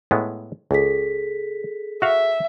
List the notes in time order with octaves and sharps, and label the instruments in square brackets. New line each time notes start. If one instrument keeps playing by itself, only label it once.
[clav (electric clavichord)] A2 G#3 B3
[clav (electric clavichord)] C#2 [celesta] G#4 A4 B6
[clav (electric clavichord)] F#4 F5 [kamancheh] E5